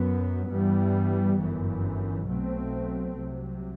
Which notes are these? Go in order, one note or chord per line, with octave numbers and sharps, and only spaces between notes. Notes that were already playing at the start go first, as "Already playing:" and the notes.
Already playing: F#2 F#3 B3
G2 E3 G3 B3
G1 F#2 E3
B1 B2 F#3 A3 C4
C2 C3 F#3